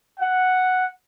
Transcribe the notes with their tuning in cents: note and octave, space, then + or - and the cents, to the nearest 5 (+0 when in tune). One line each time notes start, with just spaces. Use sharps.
F#5 +0